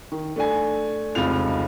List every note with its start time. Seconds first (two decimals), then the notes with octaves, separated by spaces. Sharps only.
0.12 D#3
0.36 A3 D4 G#5
1.15 F1 C#2 C3 F4 F7